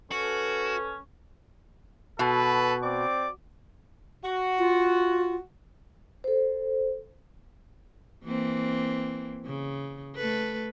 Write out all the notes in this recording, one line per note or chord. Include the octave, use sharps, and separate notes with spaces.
C#4 F#4 A4 B4
B2 F#4 A4 B4
C4 D5 D6
F#4
F4
A4 C5
E3 A#3 C4
C#3
A3 A4 B4